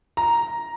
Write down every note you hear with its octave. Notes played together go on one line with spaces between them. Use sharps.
A#5